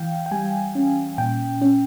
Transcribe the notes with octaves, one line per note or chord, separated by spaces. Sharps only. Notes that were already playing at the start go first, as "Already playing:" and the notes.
Already playing: E3 F5 G5
G5
G3 G#5
C#4
A#2 G5
C#4